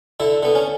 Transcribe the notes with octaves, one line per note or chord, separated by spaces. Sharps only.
D3 E4
D3 B3
C#4